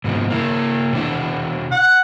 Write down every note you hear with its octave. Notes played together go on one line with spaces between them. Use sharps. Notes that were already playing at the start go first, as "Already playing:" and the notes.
G#2 B2 F3
A#3 E4
B2 D4 E4
F#5